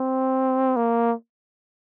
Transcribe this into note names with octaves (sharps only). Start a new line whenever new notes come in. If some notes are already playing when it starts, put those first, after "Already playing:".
Already playing: C4
A#3